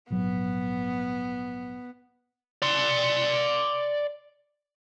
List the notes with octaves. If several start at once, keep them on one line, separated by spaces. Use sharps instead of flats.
A#1 G#2 F#3 B3
D5 C6